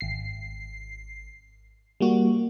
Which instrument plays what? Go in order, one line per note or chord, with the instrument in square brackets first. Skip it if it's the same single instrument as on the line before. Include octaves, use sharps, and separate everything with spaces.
[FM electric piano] G#1 C7
G3 A#3 F#4